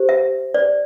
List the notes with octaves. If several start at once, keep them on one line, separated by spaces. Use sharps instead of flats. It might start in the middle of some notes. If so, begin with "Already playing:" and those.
Already playing: G4 C5
E5
D5